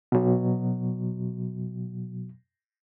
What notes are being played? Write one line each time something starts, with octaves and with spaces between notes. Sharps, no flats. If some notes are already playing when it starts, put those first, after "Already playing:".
B2 F#3